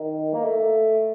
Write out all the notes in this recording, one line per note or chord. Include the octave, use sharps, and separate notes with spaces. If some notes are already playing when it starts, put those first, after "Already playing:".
Already playing: D#3
A#3
A3